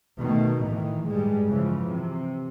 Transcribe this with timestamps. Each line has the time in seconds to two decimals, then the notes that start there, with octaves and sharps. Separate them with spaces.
0.19 B2 D#3 A3
0.65 A2 D#3 E3
1.08 G2 G3 G#3
1.48 C#3 E3 F3
1.88 C3